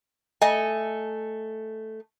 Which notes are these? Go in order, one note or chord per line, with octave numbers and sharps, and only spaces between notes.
A3 D#5 G#5